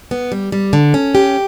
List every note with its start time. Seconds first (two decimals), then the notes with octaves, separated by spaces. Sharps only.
0.11 B3
0.32 G3
0.52 G3
0.73 D3
0.94 C#4
1.15 G4